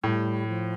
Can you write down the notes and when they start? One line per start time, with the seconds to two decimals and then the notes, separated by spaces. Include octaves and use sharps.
0.03 A2 G3
0.48 F3